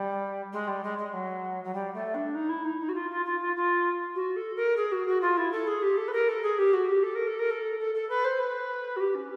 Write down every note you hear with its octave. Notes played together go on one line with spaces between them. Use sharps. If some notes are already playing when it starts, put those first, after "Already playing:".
Already playing: G3
G#3
G3
G#3
G#3
F#3
F#3
G3
A3
D4
D#4
E4
D#4
D#4
F#4
F4
F4
F4
F4
F4
F#4
A4
A#4
G#4
F#4
F#4
F4
E4
A4
G#4
G4
A4
B4
A#4
A4
G#4
G4
F#4
G4
A4
A#4
A4
A#4
A4
A4
A4
B4
C5
B4
F#4
G4
C#4